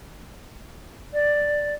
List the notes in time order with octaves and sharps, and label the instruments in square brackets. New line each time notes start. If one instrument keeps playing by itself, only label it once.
[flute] D5